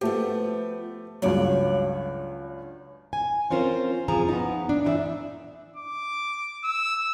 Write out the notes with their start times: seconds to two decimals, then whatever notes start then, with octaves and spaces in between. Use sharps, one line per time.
0.01 F3 A3 B3 G4
1.22 C#2 G2 F#3 C#5 D5
3.13 G#5
3.50 C4 C#4 F4 A#4 C5
4.08 F2 F3 G#4 A#5
4.28 B3 C#4 D#4
4.69 D4
4.84 E3 D#4 E4 D5 E5
5.76 D6
6.64 E6